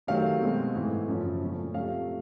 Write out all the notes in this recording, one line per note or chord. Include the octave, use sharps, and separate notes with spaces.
C3 D#3 F#3 A3 C4 F5
B2 G#3 C4
G#2 E3 A3
F#2 C#3 F3
A#2 F3 A3 C#4
C3 F3 A3 F5